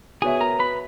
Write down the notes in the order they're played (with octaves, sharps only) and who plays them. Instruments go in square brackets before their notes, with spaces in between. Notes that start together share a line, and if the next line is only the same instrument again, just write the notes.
[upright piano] B3 F#4 C#5 E5 [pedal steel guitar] G#4 G#5
[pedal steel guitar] A#4 A#5
B4 B5